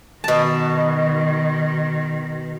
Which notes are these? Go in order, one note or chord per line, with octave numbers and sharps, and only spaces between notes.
B2 D#3 A5